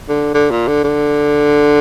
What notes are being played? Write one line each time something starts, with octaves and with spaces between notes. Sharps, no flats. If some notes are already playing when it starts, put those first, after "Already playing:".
D3
D3
A#2
D3
D3